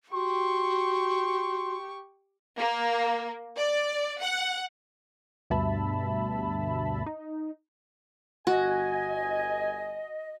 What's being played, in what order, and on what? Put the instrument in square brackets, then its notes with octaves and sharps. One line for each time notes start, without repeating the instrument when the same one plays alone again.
[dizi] F#4 [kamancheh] G4 C#6 [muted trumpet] C6
[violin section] A#3
D5
F#5
[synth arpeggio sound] D2 G2 B2 E5 A5 B5
D#4
[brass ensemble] G1 G#5 [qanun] F#4 [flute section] D#5